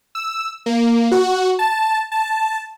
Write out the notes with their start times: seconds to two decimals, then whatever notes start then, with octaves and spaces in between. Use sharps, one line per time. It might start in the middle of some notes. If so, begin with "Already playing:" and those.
0.15 E6
0.66 A#3
1.12 F#4
1.59 A5
2.12 A5